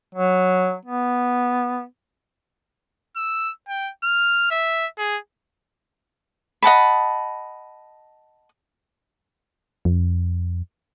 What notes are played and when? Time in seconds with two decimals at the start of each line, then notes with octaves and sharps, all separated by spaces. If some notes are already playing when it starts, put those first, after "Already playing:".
0.15 F#3
0.85 B3
3.16 E6
3.68 G5
4.04 F6
4.51 E5
4.98 G#4
6.63 D#5 F#5 A5 B5
9.85 F2